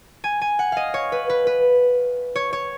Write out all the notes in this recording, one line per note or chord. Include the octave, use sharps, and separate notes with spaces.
G#5
G#5
F#5
D#5 F5
C#5
B4
B4
B4
C#5
C#5